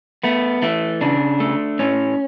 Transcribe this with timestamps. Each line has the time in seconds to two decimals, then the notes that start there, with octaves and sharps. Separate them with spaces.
0.24 A3 B3
0.62 E3 A3
1.01 C#3 D4
1.40 A3
1.79 A2 C#4